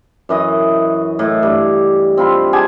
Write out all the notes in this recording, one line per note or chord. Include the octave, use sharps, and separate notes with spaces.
F#2 E3 D#5
A2
G2
C4 F4 B5 C6
G4 G#4 G#5 A5